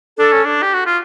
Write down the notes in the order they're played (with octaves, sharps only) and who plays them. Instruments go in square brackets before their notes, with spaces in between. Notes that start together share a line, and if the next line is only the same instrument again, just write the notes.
[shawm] D4 [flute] A4
[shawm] C#4
D4
G4
F#4
F4